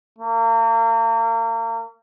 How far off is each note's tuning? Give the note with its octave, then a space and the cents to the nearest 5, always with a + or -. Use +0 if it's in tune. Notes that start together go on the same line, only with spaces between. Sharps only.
A#3 -35